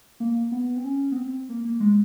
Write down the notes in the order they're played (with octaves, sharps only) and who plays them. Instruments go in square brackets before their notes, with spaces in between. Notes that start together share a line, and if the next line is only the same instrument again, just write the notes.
[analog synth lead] A#3
B3
C4
C#4
B3
C4
A#3
A#3
G#3